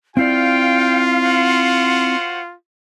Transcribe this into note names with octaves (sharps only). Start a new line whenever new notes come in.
C4 E4 F4 D5 F5 G5
F#4 C5 F#5